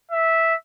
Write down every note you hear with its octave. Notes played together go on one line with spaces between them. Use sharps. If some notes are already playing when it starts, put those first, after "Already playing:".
E5